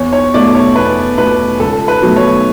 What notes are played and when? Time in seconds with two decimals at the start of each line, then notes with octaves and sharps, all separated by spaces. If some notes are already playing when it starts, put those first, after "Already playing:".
Already playing: E2 C#5
0.13 C#5
0.34 B2 A3 D5
0.55 C#5
0.76 E2 B4
1.18 B2 A3 B4
1.60 C#2 A4
1.88 B4
2.02 B2 F#3 A3
2.16 C#5